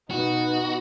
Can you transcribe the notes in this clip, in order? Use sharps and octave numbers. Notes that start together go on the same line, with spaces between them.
B2 B3 D#4 F#4